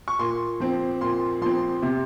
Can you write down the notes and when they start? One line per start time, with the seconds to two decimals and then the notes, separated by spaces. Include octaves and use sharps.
0.08 C#6
0.19 A#2 C6
0.60 F3 C4
1.01 A#2 C6
1.42 F3 C4 C6
1.82 C3